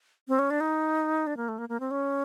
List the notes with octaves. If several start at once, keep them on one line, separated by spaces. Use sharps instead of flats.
C4
C#4
D4
D#4
D4
A#3
A3
A#3
A#3
C4
C#4